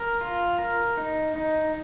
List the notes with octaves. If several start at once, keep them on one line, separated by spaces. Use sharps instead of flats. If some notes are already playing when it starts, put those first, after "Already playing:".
Already playing: A#4
F4
A#4
D#4
D#4